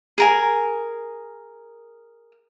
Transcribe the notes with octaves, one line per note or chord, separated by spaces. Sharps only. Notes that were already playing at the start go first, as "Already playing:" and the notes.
G#4 A#4 G#5